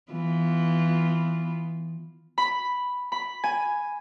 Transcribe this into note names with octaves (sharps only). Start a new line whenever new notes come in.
E3 B3 F4
B5
B5
G#5